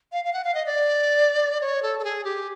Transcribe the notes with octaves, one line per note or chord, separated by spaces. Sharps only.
F5
F5
F#5
F5
D#5
D5
C#5
A4
A4
G#4
G4